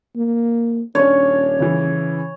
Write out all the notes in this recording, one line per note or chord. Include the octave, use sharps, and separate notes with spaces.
A#3
D#1 C#4 D4 C#5
C#3 E3